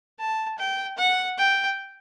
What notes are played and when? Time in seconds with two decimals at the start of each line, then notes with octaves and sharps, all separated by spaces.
0.19 A5
0.58 G5
0.98 F#5
1.38 G5